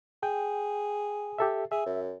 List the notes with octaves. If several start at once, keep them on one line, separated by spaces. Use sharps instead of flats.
G#4 G5
G4 A4 E5
G#4 E5
F#2